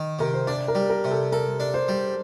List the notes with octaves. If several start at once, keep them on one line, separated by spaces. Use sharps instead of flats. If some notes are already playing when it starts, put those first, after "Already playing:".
Already playing: D#3
C3 A#4
C5
D4 D5
A#4
G3
A#4
C3
A4
A4 A#4
D4
C5
G3